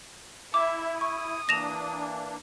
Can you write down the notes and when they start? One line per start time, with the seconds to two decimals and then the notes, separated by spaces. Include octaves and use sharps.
0.54 E4 E5 D6
1.01 C#6 D#6
1.49 E3 A#3 D4 A#6 E7 F7